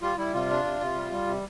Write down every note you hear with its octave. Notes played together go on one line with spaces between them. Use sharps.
G3 F4
G3 E4
C3 F4
D4
C3
C3
G3
G3
C3